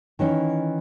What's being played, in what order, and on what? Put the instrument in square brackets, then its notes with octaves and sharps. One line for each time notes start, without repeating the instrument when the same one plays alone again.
[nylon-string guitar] D#3 E3 C#4 D#4